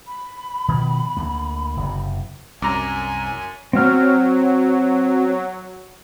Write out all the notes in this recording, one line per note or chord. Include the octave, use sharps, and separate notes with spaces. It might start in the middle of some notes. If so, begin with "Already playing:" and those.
B5
B2 D#3 F3
D2 A#3
F#1 C3
C2 F#2 G#5 A#5 D6
F#3 C4 F6